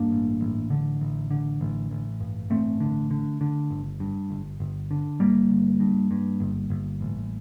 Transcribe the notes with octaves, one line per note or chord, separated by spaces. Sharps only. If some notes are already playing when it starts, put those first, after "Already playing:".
Already playing: G2 A#3 D4
A1
A1
D3
A1
D3
A1
A1
G2
A1 A3 C4
D3
D3
D3
G1
G2
G1
G1
D3
G1 G3 A#3
G1
G2
G2
G1
G1
A1